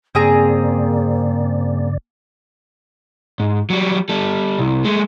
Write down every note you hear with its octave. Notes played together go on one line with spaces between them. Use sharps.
G2 C#3 A#3 C4 G#4 D5 A#5
G#2
F#3 G3
G3 A4
C2
G#3 A3